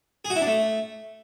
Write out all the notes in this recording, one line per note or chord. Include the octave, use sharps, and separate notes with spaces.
G#4
F#4
E4
D4
A3